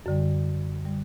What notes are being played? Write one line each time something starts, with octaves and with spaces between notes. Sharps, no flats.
F#2 D3 G3
D3 G3